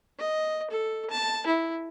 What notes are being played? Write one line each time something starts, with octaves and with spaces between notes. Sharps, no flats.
D#5
A4
A5
E4